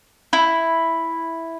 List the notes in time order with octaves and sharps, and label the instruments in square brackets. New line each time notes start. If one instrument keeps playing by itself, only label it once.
[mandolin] E4